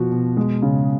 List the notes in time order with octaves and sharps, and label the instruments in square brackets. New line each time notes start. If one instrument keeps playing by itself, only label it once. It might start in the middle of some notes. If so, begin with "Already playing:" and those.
Already playing: [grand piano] B2 F3 F#4
B2
G#3
C#3